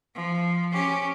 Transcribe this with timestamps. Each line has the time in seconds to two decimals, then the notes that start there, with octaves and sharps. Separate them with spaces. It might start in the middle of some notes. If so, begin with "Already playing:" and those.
0.15 F3
0.73 C#4 G4